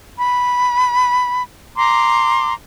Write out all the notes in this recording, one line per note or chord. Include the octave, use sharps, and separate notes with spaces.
B5
A#5 C6 D6